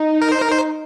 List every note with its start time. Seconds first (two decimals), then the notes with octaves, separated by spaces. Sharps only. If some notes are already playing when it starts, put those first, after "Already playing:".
Already playing: D#4
0.22 A#4
0.32 C5
0.42 A#4
0.51 C5